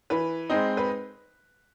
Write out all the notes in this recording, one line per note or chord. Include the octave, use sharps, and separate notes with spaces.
E3 B4
G#3 C4 D#4
B4